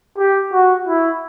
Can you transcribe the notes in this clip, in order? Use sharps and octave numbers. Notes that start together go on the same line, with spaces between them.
G4
F#4
E4